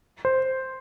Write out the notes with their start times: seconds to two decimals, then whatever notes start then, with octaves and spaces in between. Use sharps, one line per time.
0.25 C5